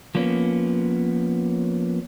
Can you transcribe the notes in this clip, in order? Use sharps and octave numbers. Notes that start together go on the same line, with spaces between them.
F3 A#3 B3 C#4